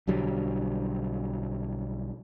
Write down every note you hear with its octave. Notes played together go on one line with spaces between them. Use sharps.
B1 D3 F#3 G3